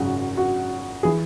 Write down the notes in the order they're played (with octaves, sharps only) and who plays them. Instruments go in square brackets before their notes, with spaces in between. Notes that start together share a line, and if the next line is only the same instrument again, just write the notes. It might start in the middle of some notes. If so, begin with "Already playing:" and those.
Already playing: [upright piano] G#1 F#2 C#3 F#4
F#4
E3 G#4